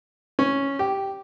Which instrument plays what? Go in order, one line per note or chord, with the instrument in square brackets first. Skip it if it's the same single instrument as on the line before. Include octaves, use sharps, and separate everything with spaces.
[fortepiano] C#4
G4